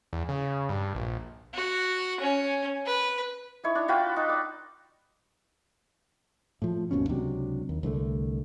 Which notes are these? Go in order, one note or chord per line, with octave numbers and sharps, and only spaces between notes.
E2
C#3
G2
A#1
F#4
C#4
B4
D#4 E4 C#5
D4
F4 F#4 B4 G5
D#4
D5
A2 F3
G#1 D#2 B2 C#4
C#2 C3 F#3 D4
D#2
C2 D3 F#3 A3